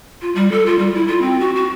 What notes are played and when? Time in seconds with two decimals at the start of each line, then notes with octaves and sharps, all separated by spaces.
0.21 F4
0.35 G3
0.52 A4
0.66 F4
0.79 G3
0.95 E4
1.08 F4
1.22 C4
1.40 F#4
1.56 F#4